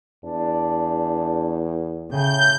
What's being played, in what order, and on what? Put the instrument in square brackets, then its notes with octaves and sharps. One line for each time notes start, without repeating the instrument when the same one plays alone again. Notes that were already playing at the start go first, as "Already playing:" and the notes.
[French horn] E2 [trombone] D4
[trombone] A2 [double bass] C#3 [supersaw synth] G6